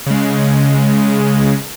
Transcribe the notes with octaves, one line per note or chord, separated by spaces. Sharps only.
C#3 G#3